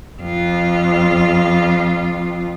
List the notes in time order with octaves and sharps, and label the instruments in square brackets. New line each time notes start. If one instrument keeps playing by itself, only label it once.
[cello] F2 F4